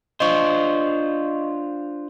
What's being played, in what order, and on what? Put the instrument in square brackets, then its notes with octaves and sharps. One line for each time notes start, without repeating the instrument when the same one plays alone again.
[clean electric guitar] D4 F4 C5 [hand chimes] D#5 C#6